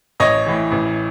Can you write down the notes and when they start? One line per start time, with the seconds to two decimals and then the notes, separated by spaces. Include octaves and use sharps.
0.20 A1 C#5 D#5
0.46 A2 E3
0.72 A1